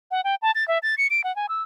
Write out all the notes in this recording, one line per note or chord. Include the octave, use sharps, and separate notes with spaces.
F#5
G5
A5
A6
E5
A6
C#7
D7
F#5
G#5
E6